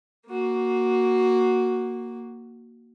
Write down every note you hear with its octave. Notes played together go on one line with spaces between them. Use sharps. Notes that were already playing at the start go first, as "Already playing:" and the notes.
A#3 F#4